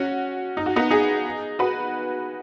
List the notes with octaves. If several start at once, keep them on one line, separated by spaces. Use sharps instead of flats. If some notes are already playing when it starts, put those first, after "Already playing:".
Already playing: C#4 F#4
D#4
F#4
B3 D#4
D#4 G#4
F#4 B4